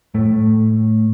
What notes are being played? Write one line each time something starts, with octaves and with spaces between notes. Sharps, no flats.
A2 A3